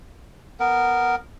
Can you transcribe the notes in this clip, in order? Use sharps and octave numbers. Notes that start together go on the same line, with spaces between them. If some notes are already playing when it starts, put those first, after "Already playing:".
B3 A#4